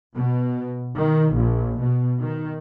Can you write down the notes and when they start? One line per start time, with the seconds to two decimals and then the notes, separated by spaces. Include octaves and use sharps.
0.14 B2
0.96 D#3
1.35 A#1
1.79 B2
2.20 D#3